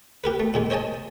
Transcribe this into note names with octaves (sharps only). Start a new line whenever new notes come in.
G4 A#4 B4
A3
A#2 D#3 G#3
C5 C#5 D#5 G#5 A5